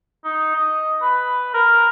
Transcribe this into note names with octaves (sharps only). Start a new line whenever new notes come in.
D#4
D#5
B4
A#4